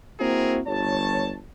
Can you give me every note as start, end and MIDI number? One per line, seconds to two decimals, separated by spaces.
0.20 0.60 58
0.20 0.60 60
0.20 0.60 64
0.20 0.60 66
0.20 0.60 68
0.20 0.60 70
0.67 1.37 31
0.67 1.37 73
0.67 1.37 81